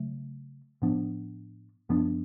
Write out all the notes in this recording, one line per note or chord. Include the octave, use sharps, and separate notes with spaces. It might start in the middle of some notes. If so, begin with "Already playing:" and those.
Already playing: C#3 F#3 A3
A2 F3 B3 D4
F#2 F3 B3 D4